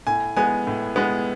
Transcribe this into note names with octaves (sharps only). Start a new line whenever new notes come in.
A2 G#5
G#3 B3 G#5
A2
G#3 B3